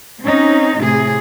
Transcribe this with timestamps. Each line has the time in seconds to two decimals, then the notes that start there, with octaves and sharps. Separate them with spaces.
0.24 C4 C#4 D#4
0.81 A2 C3 G#4